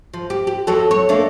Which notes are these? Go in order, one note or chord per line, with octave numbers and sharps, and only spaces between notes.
F3
G4
G4
F2 F#3 A4
C#5
A3 A#3 D4